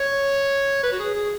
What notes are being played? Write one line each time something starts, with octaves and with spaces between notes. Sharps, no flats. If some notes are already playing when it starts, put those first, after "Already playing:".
Already playing: C#5
B4
F#4
G#4
G#4